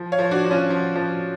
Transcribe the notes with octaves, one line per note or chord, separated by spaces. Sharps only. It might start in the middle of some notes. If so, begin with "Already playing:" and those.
Already playing: F3
C#5 F5
F3
D4 F#4
F3
C#4 F4
F3
F3